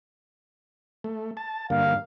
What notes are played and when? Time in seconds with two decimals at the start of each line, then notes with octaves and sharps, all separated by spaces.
1.04 A3
1.37 A5
1.70 G2 D3 A#3 F5